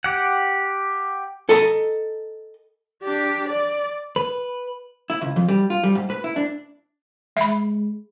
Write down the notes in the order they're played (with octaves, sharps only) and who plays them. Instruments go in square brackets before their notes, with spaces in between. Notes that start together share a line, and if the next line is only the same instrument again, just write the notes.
[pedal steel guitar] G4 F#5
[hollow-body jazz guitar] A4 D#5 A#5
[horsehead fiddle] D4 G4
D5
[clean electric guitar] B4
[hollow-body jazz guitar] E4
C#2
F2
G3
F4
G3
G#2
B4
E4
D4
[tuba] G#3 [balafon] E5 B5